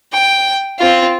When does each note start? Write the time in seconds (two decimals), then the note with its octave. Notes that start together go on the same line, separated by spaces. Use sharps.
0.13 G5
0.79 C4 F4